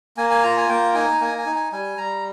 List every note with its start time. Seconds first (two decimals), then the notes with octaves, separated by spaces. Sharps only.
0.17 A#3 G#5
0.30 G#5
0.43 F4 A#5
0.57 G#5
0.69 A#3 G5
0.94 D#4 G#5
1.21 A#3 G#5
1.38 G#5
1.46 D#4
1.56 G#5
1.72 G3 G#5
1.98 G3 A#5